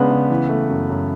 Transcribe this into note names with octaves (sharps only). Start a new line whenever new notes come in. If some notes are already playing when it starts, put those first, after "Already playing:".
Already playing: C#3 G#3 B3 D4
C#3
E3
A3
F#2
F#2